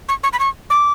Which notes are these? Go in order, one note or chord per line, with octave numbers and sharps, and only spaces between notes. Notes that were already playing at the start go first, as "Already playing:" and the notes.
C#6
C#6
B5
C#6
D6